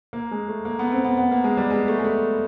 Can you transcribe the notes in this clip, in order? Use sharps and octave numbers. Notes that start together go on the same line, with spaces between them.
A#3
G#3
A3
A#3
B3
C4
B3
B3
A#3
G#3
G3
G#3
A3
G#3
A3